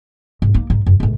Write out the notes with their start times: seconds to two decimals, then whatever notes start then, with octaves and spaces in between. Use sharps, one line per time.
0.42 G#2
0.54 A#3 D#4
0.70 G#2 D#4
0.86 F#2
1.00 C#2 A2